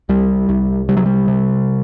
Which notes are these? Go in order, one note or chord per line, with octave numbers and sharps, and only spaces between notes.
C2 G3
C2
C3 G3
F#3
G3
C3